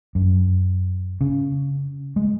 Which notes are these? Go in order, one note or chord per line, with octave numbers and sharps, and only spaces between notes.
F#2
C#3
G#3